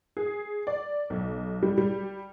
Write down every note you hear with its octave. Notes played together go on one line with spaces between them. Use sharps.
G#4
D5
B1
G3
G3